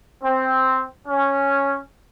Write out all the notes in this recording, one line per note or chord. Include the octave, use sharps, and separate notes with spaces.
C4
C#4